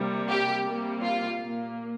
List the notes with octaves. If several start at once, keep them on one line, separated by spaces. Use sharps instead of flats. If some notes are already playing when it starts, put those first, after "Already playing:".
Already playing: C3 G3 A#3
G4
C3 G3 A#3
F4
A#2 A#3